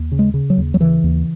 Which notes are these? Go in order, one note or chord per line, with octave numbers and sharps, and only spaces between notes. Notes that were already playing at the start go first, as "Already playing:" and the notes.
Already playing: D#2
C#3
G#3
C#3
F#3
D#2
F#3
C#3 E3
D#2